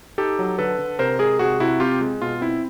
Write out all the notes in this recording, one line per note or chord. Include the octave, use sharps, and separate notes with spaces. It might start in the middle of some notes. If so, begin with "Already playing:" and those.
D#4 G4 A4
F#3
D3 A4 B4
D3
C3 A#4 C5
G#3 G#4 A#4
C3 F#4 G#4
C3 E4 F#4
C4 F4 G4
G#3
B2 F4
C4 E4